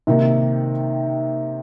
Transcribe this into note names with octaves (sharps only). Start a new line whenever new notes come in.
C3 D#3 A#3 D#4